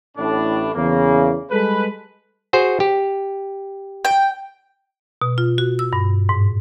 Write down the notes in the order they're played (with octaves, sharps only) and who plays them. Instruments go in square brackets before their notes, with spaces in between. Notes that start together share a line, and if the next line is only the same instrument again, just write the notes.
[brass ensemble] A1 A2 D4
E2 C#3 A#3
G3 G#3 A4 B4
[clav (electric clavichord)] F#4 G#4 C5
G4
[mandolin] G5
[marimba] B2
F4
F#4
E6
G2
G#2